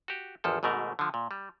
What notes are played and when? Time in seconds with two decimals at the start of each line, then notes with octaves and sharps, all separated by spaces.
0.08 F#4 G4
0.44 G#1 E2 F3 A4
0.63 G#1 G#2 B2 A3 A#4
0.99 D3 F3
1.14 A#2
1.31 G3